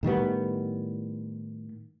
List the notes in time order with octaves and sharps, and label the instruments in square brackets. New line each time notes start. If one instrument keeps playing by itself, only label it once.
[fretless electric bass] A2 D#3 G3 B3